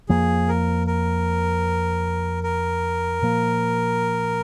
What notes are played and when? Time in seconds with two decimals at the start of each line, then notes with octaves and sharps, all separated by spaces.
0.09 F2 F3 A#3 G#4
0.48 A#4
0.87 A#4
2.43 A#4
3.22 A#2 F3 A#3